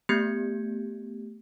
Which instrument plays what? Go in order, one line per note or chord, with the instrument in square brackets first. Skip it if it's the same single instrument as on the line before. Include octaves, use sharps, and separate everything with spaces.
[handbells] A3 B3 G4 G6 G#6 C#7